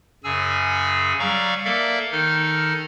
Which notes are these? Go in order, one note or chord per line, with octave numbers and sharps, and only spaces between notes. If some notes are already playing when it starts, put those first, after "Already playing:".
F#2 C#3 G#4 G#5 E6
F#3 G3 D5 F5 A#5 C#6
A#3 A4 A#4 D5 E5 F5
D#3 D#4 A4 F6